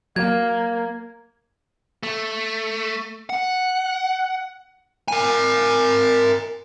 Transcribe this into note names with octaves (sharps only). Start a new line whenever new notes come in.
F#3 A#3 G#6
A3
F#5
A#4 G#5